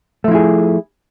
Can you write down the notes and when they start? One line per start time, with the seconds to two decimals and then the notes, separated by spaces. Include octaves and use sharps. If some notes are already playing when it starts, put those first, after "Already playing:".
0.24 A3
0.28 F3
0.31 E4
0.35 G#4